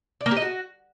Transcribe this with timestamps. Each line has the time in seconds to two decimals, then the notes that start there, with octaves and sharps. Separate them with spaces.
0.21 D5
0.26 A#3
0.31 G4
0.36 D#5
0.42 F#4